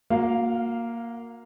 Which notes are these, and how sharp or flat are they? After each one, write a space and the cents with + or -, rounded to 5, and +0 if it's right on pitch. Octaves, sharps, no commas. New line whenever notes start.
A#3 +0 F#4 -40 F5 -10